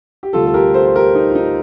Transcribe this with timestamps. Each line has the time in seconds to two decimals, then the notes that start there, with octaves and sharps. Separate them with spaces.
0.23 G4
0.33 D2 C3 G3 F4 A4
0.47 A4
0.54 G4 A#4
0.74 A4 C5
0.86 C5
0.95 G4 A#4
1.15 D#4
1.30 F4
1.35 D#4